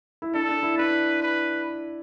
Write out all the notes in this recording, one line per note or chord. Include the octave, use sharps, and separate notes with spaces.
E4
D4 A4
D4
E4
D4 B4
B4